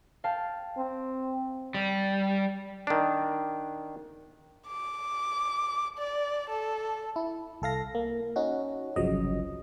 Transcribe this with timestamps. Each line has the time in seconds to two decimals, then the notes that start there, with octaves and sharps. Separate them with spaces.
0.24 F5 G5 A5
0.77 C4
1.74 G3
2.87 D#3 D4
4.67 D6
5.98 D5
6.50 A4
7.16 E4
7.62 C2 A4 F5 A#6
7.95 A#3
8.36 C#4 D#4 F#4
8.96 G1 C2 C#3 F3 F#3 D#5